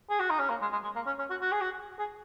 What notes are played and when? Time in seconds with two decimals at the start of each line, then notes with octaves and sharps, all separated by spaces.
0.10 G#4
0.20 F#4
0.30 D#4
0.39 C#4
0.50 A#3
0.62 G#3
0.72 G#3
0.84 G#3
0.96 A#3
1.06 C#4
1.19 C#4
1.30 F#4
1.41 F#4
1.52 G#4
1.61 F#4
1.99 G#4